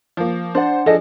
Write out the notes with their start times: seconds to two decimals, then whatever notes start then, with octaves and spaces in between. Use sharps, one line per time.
0.17 F3 A#3
0.55 D4 C5 D5 F#5
0.86 F3 D4 G#4 A4 D#5